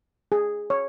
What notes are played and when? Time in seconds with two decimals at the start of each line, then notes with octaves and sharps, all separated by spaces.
0.32 G#4
0.70 C#5